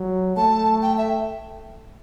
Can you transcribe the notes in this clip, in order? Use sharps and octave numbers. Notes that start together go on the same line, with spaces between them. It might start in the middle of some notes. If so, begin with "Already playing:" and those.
Already playing: F#3
A3 A5
G5
E5